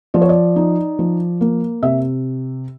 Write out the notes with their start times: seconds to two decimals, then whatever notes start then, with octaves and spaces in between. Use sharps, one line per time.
0.14 F3 D5
0.22 C#5
0.29 D5
0.56 D#4
0.99 F3
1.41 A#3
1.83 C3 E5